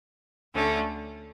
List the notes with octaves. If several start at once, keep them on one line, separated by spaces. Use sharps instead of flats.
D2 D3 A3 C#4